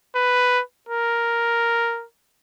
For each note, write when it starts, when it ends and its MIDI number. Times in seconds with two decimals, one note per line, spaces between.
0.16 0.61 71
0.89 2.04 70